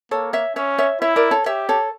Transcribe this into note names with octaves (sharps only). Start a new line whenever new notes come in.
A#3 A4 C#5
C#5 E5
C#4 C#5 E5
C#5 E5
E4 C#5 E5
A#4 D5
A4 C#5
G4 C#5 E5
A4 C#5